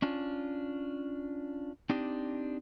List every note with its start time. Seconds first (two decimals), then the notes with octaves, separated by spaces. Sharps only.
0.02 C#4 D4 F4
1.90 C4 D4 D#4 G4